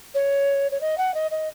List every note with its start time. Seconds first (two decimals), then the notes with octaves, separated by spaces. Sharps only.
0.14 C#5
0.71 C#5
0.81 D#5
0.98 F#5
1.14 D#5
1.31 D#5